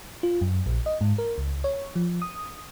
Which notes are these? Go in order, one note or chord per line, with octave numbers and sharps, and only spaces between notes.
F4
F#2
A#1
D#5
G#2
A#4
C#2
C#5
F3
D#6